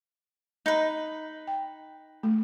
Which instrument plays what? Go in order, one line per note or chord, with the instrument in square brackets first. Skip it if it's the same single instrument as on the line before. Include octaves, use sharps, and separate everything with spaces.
[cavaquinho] D#4 B4
[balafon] G5
A3